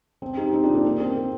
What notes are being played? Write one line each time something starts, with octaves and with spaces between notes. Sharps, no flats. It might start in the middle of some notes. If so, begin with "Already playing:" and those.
C4
D#4 G4
C4 D#4
D4 F4
A#3 D4
A#3
C4
A#3